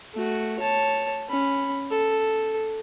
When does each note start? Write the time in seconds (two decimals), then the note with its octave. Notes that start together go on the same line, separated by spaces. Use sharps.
0.14 A3 F#4
0.59 C#5 A5
1.29 C#4 B5
1.91 A4